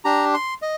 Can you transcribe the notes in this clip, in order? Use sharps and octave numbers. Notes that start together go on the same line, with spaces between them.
D4 G4 A#5
C6
D#5